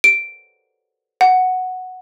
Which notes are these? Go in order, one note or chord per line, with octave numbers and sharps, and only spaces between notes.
D7
F#5